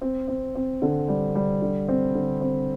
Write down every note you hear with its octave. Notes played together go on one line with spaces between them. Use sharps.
C4
C4
C4
D3
G3
G3
D3
C4
D3
C4